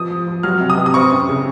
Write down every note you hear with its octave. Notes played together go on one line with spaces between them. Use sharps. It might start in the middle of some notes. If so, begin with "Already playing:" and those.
Already playing: F3 D#6
F3
F3
F#3 F6
C3
D#6
C3
D#6
C4 C#6
F#2
C#3